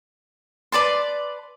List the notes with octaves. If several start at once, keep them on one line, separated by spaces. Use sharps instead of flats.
B4 D5 A5 C6